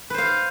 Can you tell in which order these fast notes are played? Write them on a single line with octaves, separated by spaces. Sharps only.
B4 C5 F5